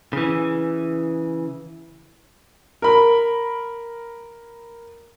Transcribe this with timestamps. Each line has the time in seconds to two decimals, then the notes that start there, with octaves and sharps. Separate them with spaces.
0.13 C#3 E3
2.82 A#4 B5